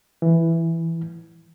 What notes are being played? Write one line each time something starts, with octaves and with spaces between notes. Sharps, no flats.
E3